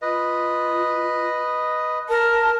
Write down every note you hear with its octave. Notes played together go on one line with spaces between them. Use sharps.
F4 B4 D#5
A#4 A5